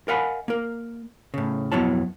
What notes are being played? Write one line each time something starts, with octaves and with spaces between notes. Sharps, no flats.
A#4 D#5 F5 F#5 G#5 B5
A#3 A#4
A2 C#3
F2 F#3 B3 E4 C#5 A5